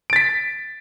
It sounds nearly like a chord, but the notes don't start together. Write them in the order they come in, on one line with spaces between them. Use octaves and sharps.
D7 A6 B6